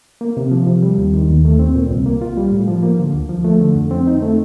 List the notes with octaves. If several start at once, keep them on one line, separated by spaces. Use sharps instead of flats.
A#3
C3
F3
C3
G3
D#2
D#3
D#2
A3
C4
A#2
C2
A#3
F4
G3
A2
F3
A#3
D3
D2
F3
A3
D3
F2
C4
D#4
A3